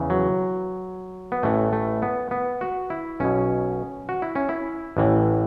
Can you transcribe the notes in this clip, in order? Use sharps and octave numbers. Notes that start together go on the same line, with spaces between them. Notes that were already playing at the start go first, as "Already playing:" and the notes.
Already playing: E2 C#3 E3
F#3
B3
A1 A2 E3 A3
A3
B3
B3
F#4
E4
B1 B2 C#4
F#4
E4
C#4
E4
A1 A2 E3